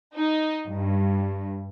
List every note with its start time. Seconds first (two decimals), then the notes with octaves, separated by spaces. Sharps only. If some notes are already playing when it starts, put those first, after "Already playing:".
0.17 D#4
0.68 G2